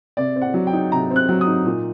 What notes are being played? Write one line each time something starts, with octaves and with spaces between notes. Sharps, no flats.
C3 D5
C4
F#5
F#3
G5
D#4
C3 A#5
C4
F#6
F#3
D#6
D#4
A#2